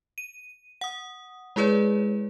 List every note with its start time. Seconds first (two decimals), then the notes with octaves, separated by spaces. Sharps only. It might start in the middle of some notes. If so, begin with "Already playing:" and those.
0.18 D#7
0.81 F#5 D#6
1.56 G#3 E4 G#4 B4 C#5 D5